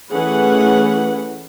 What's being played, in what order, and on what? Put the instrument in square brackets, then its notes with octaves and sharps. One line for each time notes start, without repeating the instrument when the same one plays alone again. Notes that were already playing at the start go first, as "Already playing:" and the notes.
[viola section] E3 A3 C#4 G#4 B4 F#5